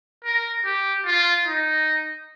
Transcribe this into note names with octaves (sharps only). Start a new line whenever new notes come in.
A#4
G4
F4
D#4